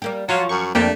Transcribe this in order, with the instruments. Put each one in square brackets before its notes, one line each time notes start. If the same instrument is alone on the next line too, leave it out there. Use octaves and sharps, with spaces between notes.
[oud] G3 A#3 G4
[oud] F3 [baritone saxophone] F#3 [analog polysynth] F4 C#5
[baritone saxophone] F#2 [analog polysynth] C#6
[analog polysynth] F2 A#3 G5 [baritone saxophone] A3 [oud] D4 G4